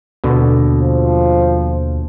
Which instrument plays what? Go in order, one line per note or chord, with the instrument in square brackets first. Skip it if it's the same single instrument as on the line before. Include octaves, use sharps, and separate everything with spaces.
[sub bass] D#2 [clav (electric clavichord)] B2 D3
[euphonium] F3